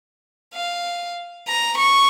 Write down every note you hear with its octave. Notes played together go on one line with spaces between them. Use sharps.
F5
A#5
C#6